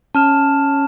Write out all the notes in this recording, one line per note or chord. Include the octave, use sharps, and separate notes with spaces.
C#4 A5 F6 E7